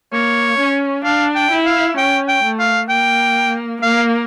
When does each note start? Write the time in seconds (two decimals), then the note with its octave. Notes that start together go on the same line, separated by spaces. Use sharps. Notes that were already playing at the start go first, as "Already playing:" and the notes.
0.12 A#3 C#5
0.59 C#4
1.04 D4 F5
1.35 G5
1.51 E4
1.66 F5
1.97 C#4 G5
2.28 G5
2.43 A3
2.59 F5
2.89 A#3 G5
3.82 A#3 F5